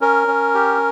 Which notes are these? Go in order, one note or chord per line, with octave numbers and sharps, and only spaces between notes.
C#4 A#4
C#4
G4